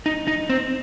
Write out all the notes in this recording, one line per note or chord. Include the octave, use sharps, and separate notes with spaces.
D#4
D#4
C4